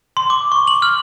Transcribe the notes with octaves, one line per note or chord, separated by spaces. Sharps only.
C6
D6
C#6
F#7
F6